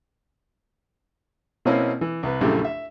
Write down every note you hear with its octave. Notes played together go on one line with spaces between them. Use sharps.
B2 A#3 C4 C#4 E4
E3
C2 B4
A#1 F#2 C#3 A3 E4 G4
E5